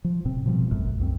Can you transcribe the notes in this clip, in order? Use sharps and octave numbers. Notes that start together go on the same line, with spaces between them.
F3
D#1 A2 C3 C4
B2 F3 G3
E1 A1 F#2 A2
C2 F#2 C4